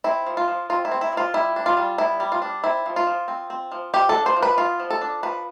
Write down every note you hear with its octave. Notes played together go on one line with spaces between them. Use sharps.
C4 E4
F3
F4
F3
C4 F4
E4
C4
E4
F3 F4
G3 E4
D4
F4
G3
B3 E4
G3
F4
D4
C4 E4
F3
F4
F3
C4
C4
F3
F3 G4
A4
D4
C5
F3
B4
B3 F4
F3
A4
D4
F3 B4